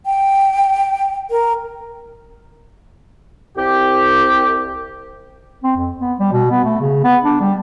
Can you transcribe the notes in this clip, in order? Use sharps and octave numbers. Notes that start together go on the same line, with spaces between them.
G5
A#4
C2 G4
C4
F2
B3
G3
B2
B3
A3
C#3
B3
D4
G3